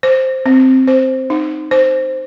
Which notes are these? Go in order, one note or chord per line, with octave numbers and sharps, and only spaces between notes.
C5
C4
C5
D#4
C5